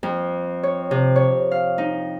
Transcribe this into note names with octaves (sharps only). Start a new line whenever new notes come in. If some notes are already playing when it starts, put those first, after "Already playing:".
F2
C#5
C3
C#5
F5
D#4